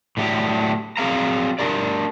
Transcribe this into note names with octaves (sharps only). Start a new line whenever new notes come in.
A2 D3 F#3 G4
F#3 C4 G#4 F5 A#5
D4 G4 A#4 D5